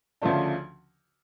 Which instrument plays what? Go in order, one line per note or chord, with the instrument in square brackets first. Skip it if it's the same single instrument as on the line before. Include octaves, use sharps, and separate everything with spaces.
[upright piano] D2 C#3 F3 A3 D4